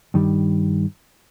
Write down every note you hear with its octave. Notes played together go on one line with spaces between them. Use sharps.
G2 D#3 G3